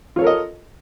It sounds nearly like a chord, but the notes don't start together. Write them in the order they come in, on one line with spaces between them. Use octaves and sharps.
F4 C#5 A4 A#4 D#5